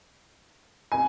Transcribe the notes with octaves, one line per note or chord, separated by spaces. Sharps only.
G#5